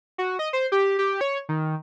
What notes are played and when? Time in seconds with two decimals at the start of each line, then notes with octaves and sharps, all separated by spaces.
0.18 F#4
0.39 D#5
0.53 C5
0.72 G4
0.99 G4
1.21 C#5
1.49 D#3